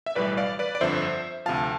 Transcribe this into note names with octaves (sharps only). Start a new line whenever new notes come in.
E5
B1 A2 E3 G3 B4 D5
D5 F5
B4 D5
D5
G1 F2 D3 F3 C5 E5
D2 C3 F3 F5 A5